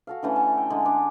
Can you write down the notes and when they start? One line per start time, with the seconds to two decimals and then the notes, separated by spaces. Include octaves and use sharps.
0.07 F#4 A4 F5
0.23 D3 E3 A3 C#4
0.36 A5
0.57 G5
0.70 D3 G#3
0.86 D4